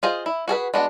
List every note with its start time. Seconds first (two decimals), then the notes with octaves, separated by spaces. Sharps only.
0.03 F4 G#4 C5 D#5
0.26 E4
0.48 F#4 G#4 A4 B4
0.74 G#3 B3 D4 F#4